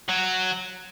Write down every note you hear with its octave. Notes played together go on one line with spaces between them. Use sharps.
F#3